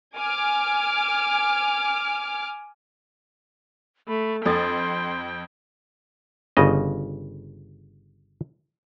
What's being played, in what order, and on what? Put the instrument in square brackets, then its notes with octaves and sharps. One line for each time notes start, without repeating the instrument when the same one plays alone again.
[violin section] G#5 D6 F6
[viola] A3 [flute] B5
[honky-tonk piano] F2 A6 [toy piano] D4 A4 [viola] G5 [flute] C6
[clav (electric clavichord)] G1 C#3 D#5